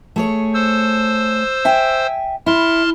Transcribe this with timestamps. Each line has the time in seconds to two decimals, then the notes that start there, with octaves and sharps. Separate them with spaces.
0.16 A3 G#4 C#5
0.54 C5 E6
1.65 E5 G5 G#5
2.46 E4 A5 C6 F6